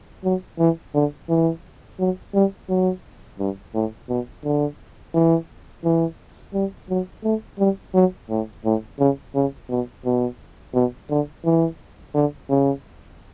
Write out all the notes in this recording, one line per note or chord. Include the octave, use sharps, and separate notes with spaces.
F#3
E3
D3
E3
F#3
G3
F#3
G2
A2
B2
D3
E3
E3
G3
F#3
A3
G3
F#3
A2
A2
C#3
C#3
B2
B2
B2
D3
E3
D3
C#3